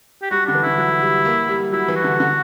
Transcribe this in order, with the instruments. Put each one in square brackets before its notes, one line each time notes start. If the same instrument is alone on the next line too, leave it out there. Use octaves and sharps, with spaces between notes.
[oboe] G4
[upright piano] G3 [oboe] F#4
[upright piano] D3 [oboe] D4
[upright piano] E3
[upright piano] D3 [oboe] E4
[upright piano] F#3
G3
A#3
G3
[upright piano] F#3 [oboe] E4
[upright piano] E3
[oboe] F#4
[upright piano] D3
D3